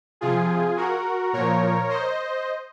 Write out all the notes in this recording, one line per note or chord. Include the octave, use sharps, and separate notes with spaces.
C3 F3 F4 G#4
F#4 A#4
A#2 F3 A#4 C#5
C5 D#5